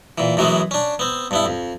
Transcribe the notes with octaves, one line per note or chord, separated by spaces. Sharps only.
A#2 E3
F#2 E3 F#3 G#3 B3
C#4 D4
B3 C4
G2 B3 E4
F2